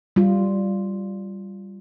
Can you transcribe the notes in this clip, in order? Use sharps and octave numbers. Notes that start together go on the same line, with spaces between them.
G3 F4